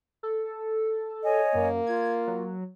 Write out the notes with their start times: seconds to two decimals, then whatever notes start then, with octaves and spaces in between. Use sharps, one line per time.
0.23 A4
1.24 C#5 D#5 G#5
1.55 F#2 A#3
1.86 F4 G#6
2.27 F#3